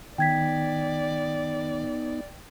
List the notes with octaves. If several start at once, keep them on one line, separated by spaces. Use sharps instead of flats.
D#3 B3 D#4 D5 G5 G#6 B6